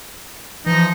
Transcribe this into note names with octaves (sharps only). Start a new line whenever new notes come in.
E3 F3 D#4